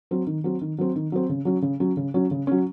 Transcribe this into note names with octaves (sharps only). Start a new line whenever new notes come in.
F#3 C4
D#3
F#3 C4
D#3
F#3 C4
D#3
F#3 C4
C#3
F#3 C#4
C#3
F#3 C#4
C#3
F#3 C#4
C#3
F#3 C#4